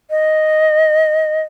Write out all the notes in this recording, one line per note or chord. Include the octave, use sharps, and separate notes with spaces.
D#5